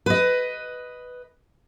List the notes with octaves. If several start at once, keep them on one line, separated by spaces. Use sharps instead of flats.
B4 D#5